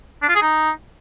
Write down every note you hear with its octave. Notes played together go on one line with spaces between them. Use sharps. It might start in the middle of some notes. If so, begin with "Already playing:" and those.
D4
F4
G#4
D#4